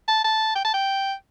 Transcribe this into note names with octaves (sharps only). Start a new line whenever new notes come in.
A5
A5
G5
A5
G5